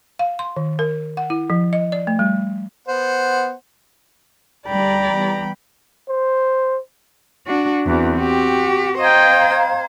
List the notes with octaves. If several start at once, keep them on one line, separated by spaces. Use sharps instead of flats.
F5
C6
D#3
A#4
F#5
E4
F3
D#5
D5
A3
G3
B3 C5 F#5
D2 G3 D5 G5 A#5 B5
E3 G3 B3
C5
D4 F#4
E2 E3 C4 F#4 F#6
F#4 G4 G5
C5 D#5 F5 G5 A#5 G#6